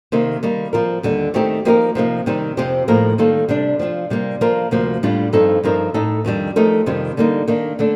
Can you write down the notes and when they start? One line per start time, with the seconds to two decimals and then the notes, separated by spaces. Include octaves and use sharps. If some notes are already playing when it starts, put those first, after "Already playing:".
0.12 C3 D#3 A#3
0.43 D#3 G3 A#3
0.73 F3 C4 F4 A#4
1.03 D#2 D3 G3
1.34 D#3 A3 C4 D#4 G4
1.65 F3 A#3 D#4 G4 A#4
1.95 C3 F3 A#3 D#4
2.26 C3 D#3 G3 C4 D#4
2.57 F2 C3 F3 C4 G4
2.88 A2 F3 A#3 D#4 A#4
3.18 D#3 G3 A#3 F4 A4
3.49 C3 G3 D4
3.80 F3 C4 F4
4.10 C3 G3 A#3
4.41 F3 A#3 F4 A#4
4.71 D2 C3 F3 A#3
5.03 A2 G3 D4 F4
5.33 G2 F3 C4 D#4 A4
5.63 G2 F3 C4 D#4 A#4
5.94 A2 A3 D#4 A4
6.25 F2 D#3 G3 D4
6.56 F3 A3 D#4 G4 A#4
6.86 F2 C3 D#3 G3
7.17 D3 G3 A#3 D#4
7.48 D#3 A#3 D4
7.79 D3 A3 D4